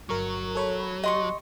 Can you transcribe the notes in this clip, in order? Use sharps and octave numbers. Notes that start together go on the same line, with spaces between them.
G1 F#3 A#4 C#6
A4 C#5 B5
G4 D#5 C6 C#6